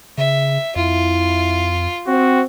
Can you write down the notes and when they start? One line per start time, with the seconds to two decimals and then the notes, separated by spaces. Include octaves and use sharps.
0.18 C#3 E5
0.76 F2 E4 F4
2.07 C4 F#4